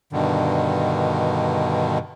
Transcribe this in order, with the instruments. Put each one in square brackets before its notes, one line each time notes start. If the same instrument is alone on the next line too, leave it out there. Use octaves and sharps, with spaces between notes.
[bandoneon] G2 B2 D3 D#3